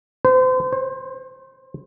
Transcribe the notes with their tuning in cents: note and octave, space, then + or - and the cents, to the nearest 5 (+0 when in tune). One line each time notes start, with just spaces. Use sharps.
C5 -35
C5 +30